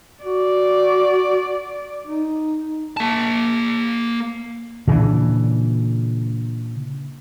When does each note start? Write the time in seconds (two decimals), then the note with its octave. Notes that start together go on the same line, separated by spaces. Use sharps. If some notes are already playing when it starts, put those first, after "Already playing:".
0.24 F#4 D5
2.07 D#4
2.97 A#3 A5
4.87 A#2 C#3 E3 D4